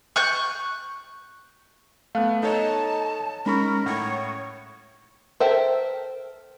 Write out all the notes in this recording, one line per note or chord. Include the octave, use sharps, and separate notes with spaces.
C#6 F#6 G6
A3 B3 F5 F#6
D#4 A4 C#5 D#5 A5
G#3 C#4 D#4 A#4 A#5 B5 C#6
A2 C#5 F#5
A4 A#4 C5 E5 G5